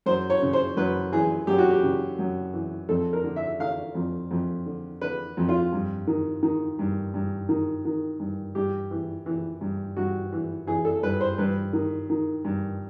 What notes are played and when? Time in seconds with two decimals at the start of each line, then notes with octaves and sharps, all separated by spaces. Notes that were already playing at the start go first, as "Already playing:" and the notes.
0.06 F#2 C5
0.30 C#5
0.42 C#3
0.53 C5
0.77 F#2 B4
1.12 E3 G#4
1.47 F#2 G4
1.58 F#4
1.70 G4
1.83 C#3
2.19 F#2
2.54 E3
2.89 F2 A4
3.13 A#4
3.24 D3
3.36 E5
3.60 D3 F5
3.95 F2
4.31 F2
4.66 D3
5.01 D3 B4
5.37 F2
5.49 F4
5.73 G2
6.07 D#3
6.43 D#3
6.79 G2
7.14 G2
7.49 D#3
7.85 D#3
8.20 G2
8.55 G2 G4
8.91 E3
9.26 E3
9.61 G2
9.97 G2 F#4
10.33 E3
10.67 E3 G#4
10.85 A4
11.03 G2 B4
11.21 C5
11.38 G2 B4
11.73 D#3
12.10 D#3
12.45 G2